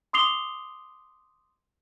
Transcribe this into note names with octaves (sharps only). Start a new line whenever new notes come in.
C6 D6 D#6 C7 F7 G7